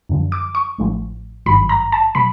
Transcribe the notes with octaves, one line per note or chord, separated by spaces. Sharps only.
F#2 D3 F3
D6
C#6
A1 A2 F3
G#1 G2 D#3 F#3 B5
A#5
A5
B2 F#3 B5